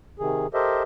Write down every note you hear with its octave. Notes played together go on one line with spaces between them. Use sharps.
C3 D#3 G#4
G4 A4 A#4 C5 D#5 E5